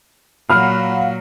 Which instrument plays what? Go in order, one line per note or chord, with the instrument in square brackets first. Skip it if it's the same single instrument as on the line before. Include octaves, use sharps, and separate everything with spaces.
[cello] A#2 F#3 [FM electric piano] F5 F#5 [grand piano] B5 F6